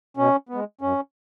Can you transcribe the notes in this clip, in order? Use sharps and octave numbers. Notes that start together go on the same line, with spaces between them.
B2 C#4
B3
G#3
F#2 C#4